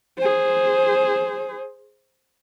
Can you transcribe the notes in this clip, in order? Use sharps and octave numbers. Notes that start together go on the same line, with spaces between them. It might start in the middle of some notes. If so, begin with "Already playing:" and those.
G#4 C5